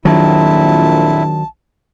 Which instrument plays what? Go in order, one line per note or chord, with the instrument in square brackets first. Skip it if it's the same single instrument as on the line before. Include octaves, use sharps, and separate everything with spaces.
[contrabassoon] A#1 [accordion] F2 A#2 E4 [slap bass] D#3 F#3 [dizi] A5